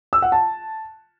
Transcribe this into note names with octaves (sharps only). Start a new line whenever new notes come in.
E6
F#5
A5